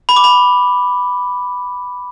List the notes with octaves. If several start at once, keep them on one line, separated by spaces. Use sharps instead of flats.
B5
D6
B5